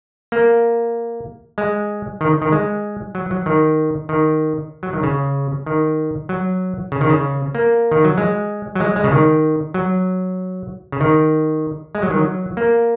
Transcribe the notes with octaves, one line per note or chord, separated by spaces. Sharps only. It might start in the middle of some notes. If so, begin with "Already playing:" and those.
A#3
G#3
D#3
D#3
G#3
F#3
F#3
D#3
D#3
F#3
D#3
C#3
D#3
F#3
C#3
D#3
C#3
A#3
D#3
F#3
G#3
F#3
G#3
G#3
C#3
D#3
F#3
C#3
D#3
G#3
F#3
D#3
F#3
A#3